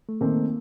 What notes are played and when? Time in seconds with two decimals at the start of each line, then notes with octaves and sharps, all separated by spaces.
0.09 A3
0.21 D#3 A3 A#3 C4